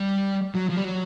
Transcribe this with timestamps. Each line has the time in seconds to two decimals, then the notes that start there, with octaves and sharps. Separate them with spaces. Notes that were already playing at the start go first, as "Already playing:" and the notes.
Already playing: G3
0.55 F#3
0.70 F3
0.77 G3
0.85 F#3